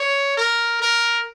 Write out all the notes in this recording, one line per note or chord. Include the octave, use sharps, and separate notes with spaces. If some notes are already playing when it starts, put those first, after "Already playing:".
Already playing: C#5
A#4
A#4